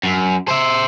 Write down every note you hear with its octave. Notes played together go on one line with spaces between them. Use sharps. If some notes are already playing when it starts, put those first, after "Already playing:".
F#2
C5 E5